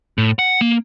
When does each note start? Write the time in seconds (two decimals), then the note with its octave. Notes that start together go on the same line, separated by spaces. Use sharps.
0.18 A2
0.39 F#5
0.61 A#3